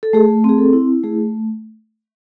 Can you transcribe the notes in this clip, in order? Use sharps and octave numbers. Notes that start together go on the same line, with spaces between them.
A4
A3 G#4
C4 G#4
A4
E4
A3 G#4